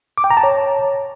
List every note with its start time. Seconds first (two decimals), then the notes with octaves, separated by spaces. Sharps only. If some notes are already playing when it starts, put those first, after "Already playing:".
0.18 D6
0.24 G5
0.31 A#5
0.37 A5
0.44 C#5